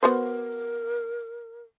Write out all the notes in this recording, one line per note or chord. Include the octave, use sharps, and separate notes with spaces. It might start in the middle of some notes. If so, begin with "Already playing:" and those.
B3 F#4 A#4 C5